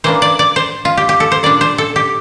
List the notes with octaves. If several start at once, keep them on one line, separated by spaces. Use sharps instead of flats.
E3 A#3 D4 C5
D5
D5
C5
F4
G4
G4
A4
C5
A#2 G3 D4 D5
C5
A4
G4